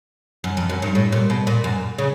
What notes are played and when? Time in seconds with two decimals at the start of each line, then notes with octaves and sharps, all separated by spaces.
0.44 F#2
0.57 F2
0.69 F#2
0.82 G2
0.95 A2
1.12 A#2
1.30 B2
1.47 A#2
1.64 F#2
1.98 C#3